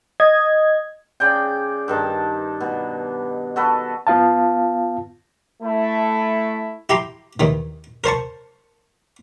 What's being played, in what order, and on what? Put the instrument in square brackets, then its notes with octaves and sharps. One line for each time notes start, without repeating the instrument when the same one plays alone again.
[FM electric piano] D#5 G#6
[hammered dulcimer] C#3 D5 G5
G2 D#3 A5
B2
F#4 A4 B4
[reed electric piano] B3 F4 F5 A5
[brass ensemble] A3 E4
[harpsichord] E4 G4 A#5 C6 D6
D#2 D#3 E3
A#4 C5 A5 C#6